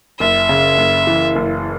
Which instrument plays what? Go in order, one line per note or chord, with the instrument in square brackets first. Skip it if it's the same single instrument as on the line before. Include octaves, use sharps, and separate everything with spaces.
[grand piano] F#1 [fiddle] E5
[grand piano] C#3
F#1
E3
F#1